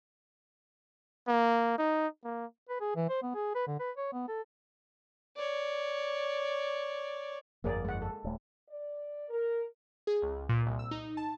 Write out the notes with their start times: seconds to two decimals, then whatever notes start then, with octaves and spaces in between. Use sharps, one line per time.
1.28 A#3
1.79 D#4
2.24 A#3
2.69 B4
2.81 G#4
2.96 E3
3.09 C5
3.23 B3
3.35 G#4
3.55 B4
3.67 D3
3.80 B4
3.97 C#5
4.13 B3
4.28 A4
5.36 C#5 D5
7.64 G1 F2 A#3 G#4 D5
7.85 G#3 F#5
8.02 A4
8.24 D#1 A3
8.68 D5
9.29 A#4
10.07 G#4
10.22 C#2
10.49 A#2
10.66 C2
10.79 E6
10.91 D#4
11.17 A5